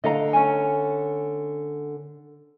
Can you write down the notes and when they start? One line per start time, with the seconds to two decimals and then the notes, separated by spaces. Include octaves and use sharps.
0.04 D3 A3 A4 D#5 F5 A#5
0.33 C#4 G#5